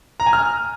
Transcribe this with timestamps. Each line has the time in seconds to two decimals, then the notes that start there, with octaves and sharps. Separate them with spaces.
0.20 A#5
0.26 G#5
0.33 F6